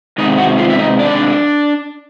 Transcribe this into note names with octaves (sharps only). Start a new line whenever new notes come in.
C3 D#3 G#3 D#4 D#5
F#4 F#5
F4 F5
E5
D#4 D#5
D4 D5